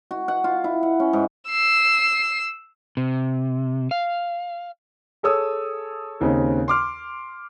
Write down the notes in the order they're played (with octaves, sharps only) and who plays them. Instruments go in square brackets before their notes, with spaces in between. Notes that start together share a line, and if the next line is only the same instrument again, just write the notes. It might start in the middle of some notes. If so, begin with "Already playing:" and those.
[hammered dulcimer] F#4
F#5
F4
E4
F#5
C#4
G#2
[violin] E6 C7
[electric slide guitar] C3
F5
[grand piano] G#4 A4 C#5 D#6 E6
D#2 C#3 C4 D#4
C6 D6 F6